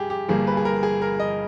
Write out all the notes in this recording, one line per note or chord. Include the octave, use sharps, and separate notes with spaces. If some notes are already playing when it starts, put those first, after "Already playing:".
Already playing: G2 G4 G#4
G4
G1 G2 G3 A#3 G#4
B4
G#4
A#4
G#4
A#4
D#5